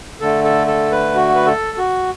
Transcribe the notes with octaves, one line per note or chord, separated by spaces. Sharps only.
D3 A3 A4
A4
A4
B4
F#4
B4
A4
F#4